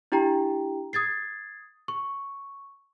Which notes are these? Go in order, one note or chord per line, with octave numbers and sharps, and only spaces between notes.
D4 E4 G4 G5 A#5
D#6 G#6 A6 C7
C#6